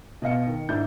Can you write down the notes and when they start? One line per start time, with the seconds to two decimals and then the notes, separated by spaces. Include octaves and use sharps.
0.22 B2 D#5 F5 C#7
0.47 D#3
0.69 G#2 D4 E4 G6